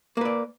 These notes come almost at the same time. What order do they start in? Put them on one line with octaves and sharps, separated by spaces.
A#3 B4 D5